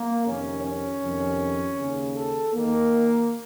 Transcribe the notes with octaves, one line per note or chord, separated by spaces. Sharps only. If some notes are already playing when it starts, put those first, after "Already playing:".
Already playing: A#3
F2 C3 D#3 C#4
C#4
F2 C3 D#3
D#2 C#3
A4
D#2 D#3 A#3